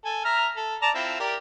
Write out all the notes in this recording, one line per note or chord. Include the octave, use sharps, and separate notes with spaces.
A4 G#5
E5 A#5 F6
A4
D5 A5 A#5
C4 E4 F4
G4 A#4 D5